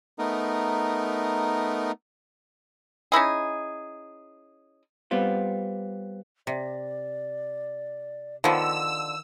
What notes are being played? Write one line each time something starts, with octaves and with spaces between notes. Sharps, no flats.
A3 B3 D#4 A#4
C#4 D#4 E4 G#4
G3 B3 C4 F4
C3 D5
D3 D#3 F3 B3 E6